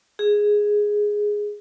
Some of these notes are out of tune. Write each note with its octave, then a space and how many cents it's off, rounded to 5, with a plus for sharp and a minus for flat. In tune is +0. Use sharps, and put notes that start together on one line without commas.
G#4 +0